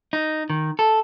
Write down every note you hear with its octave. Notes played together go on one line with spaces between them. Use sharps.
D#4
D#3
A4